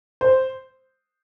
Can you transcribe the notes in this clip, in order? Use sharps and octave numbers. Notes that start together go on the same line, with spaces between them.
C5